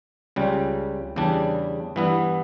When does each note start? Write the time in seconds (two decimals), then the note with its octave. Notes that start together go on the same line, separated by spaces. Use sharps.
0.36 C#2 C#3 G3
1.16 E2 C#3 G3 D4
1.96 G2 E3 B3 E4